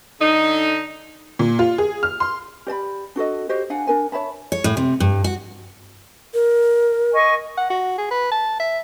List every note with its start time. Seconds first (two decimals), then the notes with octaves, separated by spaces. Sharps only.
0.20 D3 D#4
1.39 A#2
1.59 F4
1.78 G#4
2.03 F6
2.20 C6
2.67 G4 D5 A5 B5
3.16 D4 F#4 A4 D#5
3.49 F#4 G4 C5 D#5
3.70 D4 F5 F#5 G#5
3.87 D4 A#4 G#5
4.12 C#5 E5 A5 B5
4.52 C#5
4.64 A2
4.77 C3
5.00 G2
5.24 F#4
6.34 A#4
7.13 D#5 G#5 C#6
7.57 F#5
7.70 F#4
7.98 G#4
8.11 B4
8.32 A5
8.60 E5